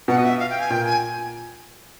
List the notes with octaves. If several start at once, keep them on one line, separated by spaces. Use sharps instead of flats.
B2 F#5
D#5
E5
F5
G5
G#5
A#2 G5
G#5